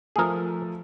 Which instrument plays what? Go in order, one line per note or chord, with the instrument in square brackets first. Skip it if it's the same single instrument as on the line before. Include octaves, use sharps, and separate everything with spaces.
[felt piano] F3 A3 [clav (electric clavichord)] G#4 A#4